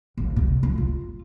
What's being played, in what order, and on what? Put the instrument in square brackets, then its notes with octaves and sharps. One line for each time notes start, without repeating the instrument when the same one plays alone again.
[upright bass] G#1
C3
G#3
F4